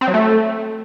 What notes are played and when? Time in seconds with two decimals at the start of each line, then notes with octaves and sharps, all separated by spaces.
0.01 C4
0.07 F#3
0.14 A3